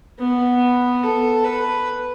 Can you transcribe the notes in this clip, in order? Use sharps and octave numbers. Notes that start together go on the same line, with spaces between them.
B3
A4
B4